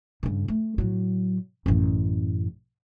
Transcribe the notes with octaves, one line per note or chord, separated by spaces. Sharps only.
G2 C#3
A3
A2 F#3
A1 F#2